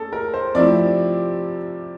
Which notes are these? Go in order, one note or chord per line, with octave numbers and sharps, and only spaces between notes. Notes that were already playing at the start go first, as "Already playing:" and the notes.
Already playing: A#3 C#4 G#4 A4
A#4
C5
C3 F3 A3 C4 E4 D5